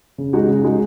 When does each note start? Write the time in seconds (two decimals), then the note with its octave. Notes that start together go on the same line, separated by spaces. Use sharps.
0.18 C#3
0.33 G#3 D#4 F#4
0.48 C#3
0.64 G#3 D#4 F#4